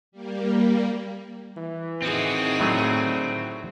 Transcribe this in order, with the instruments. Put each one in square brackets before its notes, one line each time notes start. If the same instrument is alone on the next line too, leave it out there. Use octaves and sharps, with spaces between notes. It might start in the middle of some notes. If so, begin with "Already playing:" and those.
[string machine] G3 A#3
[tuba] E3
[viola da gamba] D#3 E4 G#4 [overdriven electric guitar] C4 F#4
[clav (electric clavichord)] A2 F#3 A3 [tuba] D3